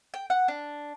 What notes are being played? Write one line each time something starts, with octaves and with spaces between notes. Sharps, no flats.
G5
F#5
D4